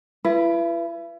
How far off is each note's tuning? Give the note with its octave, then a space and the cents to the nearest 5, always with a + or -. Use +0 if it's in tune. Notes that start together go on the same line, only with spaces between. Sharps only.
E4 +40 B4 +0